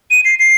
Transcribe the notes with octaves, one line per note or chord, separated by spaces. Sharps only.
D#7
C7
C7